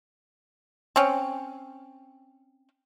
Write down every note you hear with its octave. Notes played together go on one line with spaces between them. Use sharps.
C4 C#4